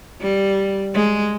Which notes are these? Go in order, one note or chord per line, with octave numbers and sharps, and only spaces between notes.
G3
G#3